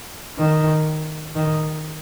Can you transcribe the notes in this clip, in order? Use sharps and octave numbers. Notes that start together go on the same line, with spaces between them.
D#3
D#3